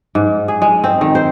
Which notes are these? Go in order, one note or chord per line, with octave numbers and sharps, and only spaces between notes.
G#2
G#4
G#3
C4
D#3
C5